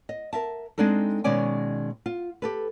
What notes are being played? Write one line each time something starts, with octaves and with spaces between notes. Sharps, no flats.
D#5
A#4 E5 A5
G#3 C4 D4 D#4 A4
B2 D#3 G#3 C#4 D5 G#5
F4
G4 A4 B4